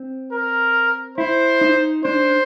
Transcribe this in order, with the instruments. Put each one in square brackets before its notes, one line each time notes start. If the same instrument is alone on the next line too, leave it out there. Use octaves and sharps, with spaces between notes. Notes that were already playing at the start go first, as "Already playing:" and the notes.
Already playing: [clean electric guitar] C4
[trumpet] A#4
[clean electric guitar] E4 [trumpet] C5
[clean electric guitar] D#4
[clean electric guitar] D4 [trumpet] C5